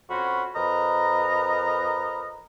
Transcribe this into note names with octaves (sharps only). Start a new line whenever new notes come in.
F2 C#4 F#4 B5 C6
F2 A#4 B4 D#5 A#5